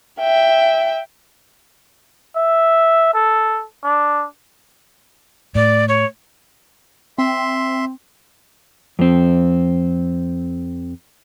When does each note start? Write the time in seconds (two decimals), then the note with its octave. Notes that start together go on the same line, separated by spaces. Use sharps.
0.20 E5 G5
2.36 E5
3.14 A4
3.84 D4
5.55 A2 D5
5.88 C#5
7.18 C4 E5 C6
8.99 F2 C4